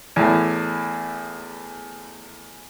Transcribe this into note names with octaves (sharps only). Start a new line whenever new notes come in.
E2 A2